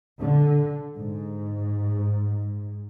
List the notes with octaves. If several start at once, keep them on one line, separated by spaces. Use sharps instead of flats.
D3
G#2